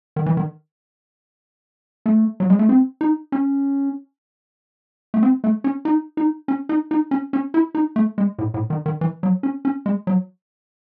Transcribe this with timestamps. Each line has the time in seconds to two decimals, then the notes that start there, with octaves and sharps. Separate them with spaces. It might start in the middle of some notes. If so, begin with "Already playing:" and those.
0.16 D#3
0.26 E3
0.37 D#3
2.06 A3
2.40 F#3
2.50 G#3
2.59 A3
2.69 C4
3.01 D#4
3.32 C#4
5.14 A3
5.23 C4
5.44 A3
5.64 C#4
5.85 D#4
6.17 D#4
6.48 C#4
6.69 D#4
6.91 D#4
7.11 C#4
7.33 C#4
7.54 E4
7.75 D#4
7.96 A3
8.18 G#3
8.39 A2
8.54 A2
8.70 D#3
8.86 D#3
9.01 E3
9.23 F#3
9.43 C#4
9.65 C#4
9.86 G#3
10.07 F#3